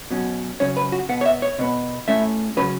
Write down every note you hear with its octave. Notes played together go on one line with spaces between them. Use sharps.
B2 F#3 C#4
F#2 C#3 F#3 C#4 C#5
B4
F#4
B2 B3 F#5
C#5
E5
C#5
B2 B3
A2 A3 C#4 E5
C#3 F#3 C#4 B4